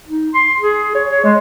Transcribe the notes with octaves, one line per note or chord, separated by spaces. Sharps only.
D#4
C6
G#4
C#5
C#5
G#3